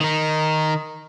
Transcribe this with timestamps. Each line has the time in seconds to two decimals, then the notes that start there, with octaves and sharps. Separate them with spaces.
0.01 D#3 D#4